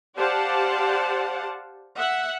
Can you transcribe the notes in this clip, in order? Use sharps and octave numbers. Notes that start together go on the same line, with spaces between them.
G4 C5 D5 F5 F#5 A5
E5 F#5